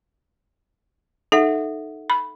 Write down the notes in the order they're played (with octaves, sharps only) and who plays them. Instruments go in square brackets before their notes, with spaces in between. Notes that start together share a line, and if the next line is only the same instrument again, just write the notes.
[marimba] D#4 [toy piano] A4 E5 F#5
[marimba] B5